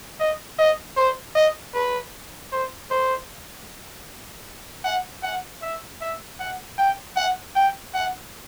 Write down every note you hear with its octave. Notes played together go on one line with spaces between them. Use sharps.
D#5
D#5
C5
D#5
B4
C5
C5
F#5
F#5
E5
E5
F#5
G5
F#5
G5
F#5